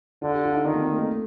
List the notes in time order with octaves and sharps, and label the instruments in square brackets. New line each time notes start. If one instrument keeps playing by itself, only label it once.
[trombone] D3 [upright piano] F4
[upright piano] G4
F4
D#4
[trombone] D#3 [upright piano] C4
[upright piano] A#3
A3
A3